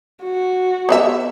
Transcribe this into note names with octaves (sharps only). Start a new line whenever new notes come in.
F#4
B3 D5 E5